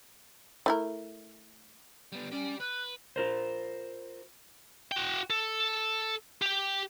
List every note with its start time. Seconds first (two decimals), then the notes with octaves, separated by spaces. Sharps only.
0.66 A3 E4 A#4
2.12 G3 B3
2.32 C#4 G4 D5
2.60 B4 F#6
3.16 F4 A#4 C5
4.92 F#4 G5
5.30 A4
6.42 G4 G5